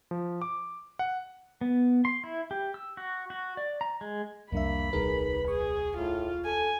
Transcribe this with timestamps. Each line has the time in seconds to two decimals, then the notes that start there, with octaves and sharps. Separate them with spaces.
0.11 F3
0.42 D6
0.99 F#5
1.61 B3
2.05 C6
2.24 E4
2.51 G4
2.74 E6
2.97 F#4
3.30 F#4
3.57 D5
3.81 A#5
4.01 G#3
4.52 C2 F2 G3 A#3 D4 E5 B5
4.93 D#1 C2 G3 D#4 G#4 A#4 B4
5.48 G#4 C#6
5.97 A2 F4
6.45 A4 G#5